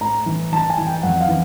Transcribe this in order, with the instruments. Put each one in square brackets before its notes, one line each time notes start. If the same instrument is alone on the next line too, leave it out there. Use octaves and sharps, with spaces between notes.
[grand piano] A2 A#5
E3
E3 A5
G#5
E3
G5
F2 F#5
F5
E3